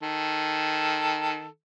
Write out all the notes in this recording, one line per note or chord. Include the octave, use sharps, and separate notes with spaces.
D#3 A4